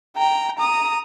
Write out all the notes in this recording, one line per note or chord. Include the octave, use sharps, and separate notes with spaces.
G5 A#5
A#5 D#6